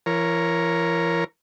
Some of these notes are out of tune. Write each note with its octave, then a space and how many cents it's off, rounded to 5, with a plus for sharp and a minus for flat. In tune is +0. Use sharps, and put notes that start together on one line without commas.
E3 +40 A#4 +0 C#5 +0